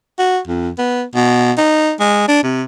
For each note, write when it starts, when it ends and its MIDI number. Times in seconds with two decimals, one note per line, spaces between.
0.19 0.39 66
0.48 0.70 41
0.79 1.04 59
1.15 1.52 47
1.58 1.93 63
2.00 2.24 56
2.28 2.44 62
2.44 2.63 48